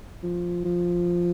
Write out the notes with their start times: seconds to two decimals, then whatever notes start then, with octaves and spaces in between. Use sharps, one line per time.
0.23 F3
0.64 F3